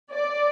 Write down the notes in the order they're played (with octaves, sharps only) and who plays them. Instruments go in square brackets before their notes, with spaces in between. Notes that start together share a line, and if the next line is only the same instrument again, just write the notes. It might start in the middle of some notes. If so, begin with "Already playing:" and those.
[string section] D5